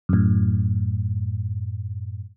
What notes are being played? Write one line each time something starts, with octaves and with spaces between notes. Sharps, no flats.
F#2 A2